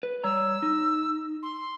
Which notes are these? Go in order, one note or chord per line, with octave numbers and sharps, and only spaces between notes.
B4
G3 C#5 A#5 E6
D#4
C6